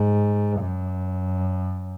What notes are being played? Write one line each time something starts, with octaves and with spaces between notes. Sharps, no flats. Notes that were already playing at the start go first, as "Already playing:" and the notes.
Already playing: G#2
F#2